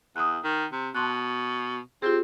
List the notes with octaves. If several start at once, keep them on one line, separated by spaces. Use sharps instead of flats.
E2 D#6 F#6
D#3
C3
B2 A5 C6 F#6
C4 F4 G4 G#4